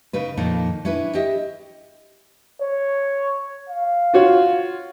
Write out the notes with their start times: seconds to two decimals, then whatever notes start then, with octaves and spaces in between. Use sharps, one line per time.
0.13 C#3 D#4 B4
0.37 F2 A#2 D#3 D#4
0.85 C#4 D4 E4 B4
1.15 G4 D#5 E5
2.61 C#5
3.69 F5
4.14 F4 F#4 C#5